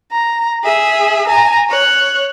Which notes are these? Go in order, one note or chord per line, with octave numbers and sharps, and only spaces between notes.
A#5
G#4 E5
G#5 A#5
C#5 F#6